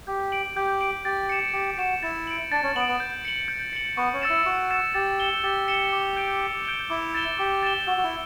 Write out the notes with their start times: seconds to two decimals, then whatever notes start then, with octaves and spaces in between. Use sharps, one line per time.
0.07 G4 G6
0.32 D7 F#7
0.56 G4 G6
0.81 D7 F#7
1.05 G4 A6
1.29 C#7 E7
1.53 G4 A6
1.78 F#4 C#7 E7
2.03 E4 A6
2.27 D7 F#7
2.52 D4 A6
2.63 C#4
2.76 B3 D7 F#7
2.88 B3
3.00 G6
3.25 C#7 F#7
3.48 G6
3.73 C#7 F#7
3.97 B3 C#6
4.13 C#4
4.22 E6 A6 C#7 E7
4.30 E4
4.46 F#4 C#6
4.70 E6 A6 C#7 E7
4.94 G4 A6
5.20 C#7 E7 G7
5.44 G4 A6
5.68 C#7 E7 G7
5.93 D6
6.16 G6 D7 G7
6.41 D6
6.65 G6 D7 G7
6.90 E4 D6
7.14 A6 E7 G7
7.38 G4 D6
7.63 A6 E7 G7
7.87 F#4 E6
7.97 F#4
8.04 E4